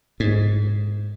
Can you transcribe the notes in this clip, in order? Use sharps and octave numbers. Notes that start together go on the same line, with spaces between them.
G#2